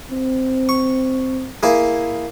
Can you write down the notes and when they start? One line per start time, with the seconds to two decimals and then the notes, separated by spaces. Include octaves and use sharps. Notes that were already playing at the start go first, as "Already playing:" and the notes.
0.11 C4
0.69 C#6
1.63 A#3 E4 G#4